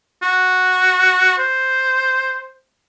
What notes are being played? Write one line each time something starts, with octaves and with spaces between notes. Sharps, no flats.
F#4
C5